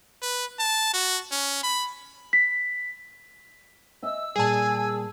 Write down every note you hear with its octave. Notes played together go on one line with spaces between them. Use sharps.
B4
A5
F#4
C#4
B5
B6
D#5 E5 G#5 E6
A#2 G3 G#4 G#5 A5